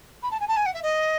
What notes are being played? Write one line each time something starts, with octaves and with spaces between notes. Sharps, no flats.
B5
A5
G#5
A5
G#5
F#5
E5
D#5